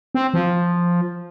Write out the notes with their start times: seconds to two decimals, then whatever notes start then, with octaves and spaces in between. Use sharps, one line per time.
0.15 C4
0.34 F3